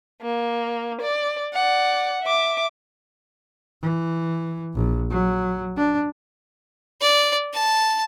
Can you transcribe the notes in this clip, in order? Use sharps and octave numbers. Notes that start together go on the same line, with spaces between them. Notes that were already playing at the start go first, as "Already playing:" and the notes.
A#3
D5
D5 F#5
E5 D6
E3
A#1
F#3
D4
D5
A5